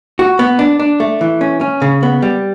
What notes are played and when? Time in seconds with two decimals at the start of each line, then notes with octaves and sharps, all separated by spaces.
0.19 F#4
0.39 B3
0.59 D4
0.80 D4
1.00 A3
1.21 E3
1.41 C#4
1.61 C#4
1.82 C#3
2.03 B3
2.22 G3